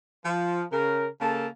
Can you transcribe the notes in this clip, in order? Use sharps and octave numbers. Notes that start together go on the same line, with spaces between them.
F3
C#3 A#4
C#3 A#3 A4 A#4 A5